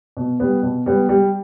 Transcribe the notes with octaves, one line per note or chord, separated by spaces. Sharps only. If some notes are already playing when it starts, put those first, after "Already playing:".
B2
G3 B3
B2
G3 B3
G3